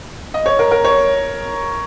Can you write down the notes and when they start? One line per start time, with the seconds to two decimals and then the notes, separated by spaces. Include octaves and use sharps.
0.34 D#5
0.46 C#5
0.59 A#4
0.71 A#4
0.85 C#5